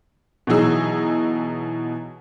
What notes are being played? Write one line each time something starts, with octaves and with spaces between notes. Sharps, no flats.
B2 E3 F#3 D#4 G#4 E6